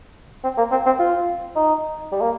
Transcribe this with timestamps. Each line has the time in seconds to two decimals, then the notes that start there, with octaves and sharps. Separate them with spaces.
0.44 C4
0.58 A#3
0.71 C4
0.86 C4
0.99 F4
1.56 D#4
2.12 G3
2.21 A#3